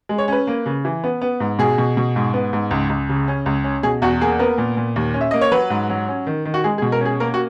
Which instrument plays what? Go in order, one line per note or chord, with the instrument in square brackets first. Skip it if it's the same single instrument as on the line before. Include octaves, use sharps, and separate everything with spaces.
[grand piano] G#3
C#5
C#4 B4
A#3
C#3
E3
B3
B3
G#2
B2 G#4
B2
B2
G#2
B3
G#2
C#2
C#2
C#3
C#4
C#2
C#4
B2 G#4
E2 F#4
A#3 G#4
B3 A#4
A#2
A#2
D#2
C#4
E5
A#3 D#5
C#5
F#3 B4
G#2
F#3
C#4
D#3
D#3
F#4
G#3 G#4
G#4
B2
A#4
C#4 G#4
A#3 A#4
F#4